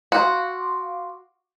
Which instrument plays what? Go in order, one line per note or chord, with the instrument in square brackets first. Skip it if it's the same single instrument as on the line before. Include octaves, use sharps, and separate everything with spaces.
[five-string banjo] F#4 [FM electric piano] F5 C6 D6